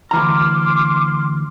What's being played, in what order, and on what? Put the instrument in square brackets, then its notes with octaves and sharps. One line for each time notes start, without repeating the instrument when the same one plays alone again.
[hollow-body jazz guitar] D2 E3 A#5 [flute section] C6 D6 F6